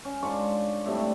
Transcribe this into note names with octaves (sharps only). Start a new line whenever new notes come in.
C#4
G#2 D4 F4 C#6
A2 C3 G3 A3